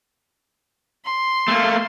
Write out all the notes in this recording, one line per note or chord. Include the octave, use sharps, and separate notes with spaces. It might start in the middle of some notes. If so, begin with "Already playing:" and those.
C6
A3 A#3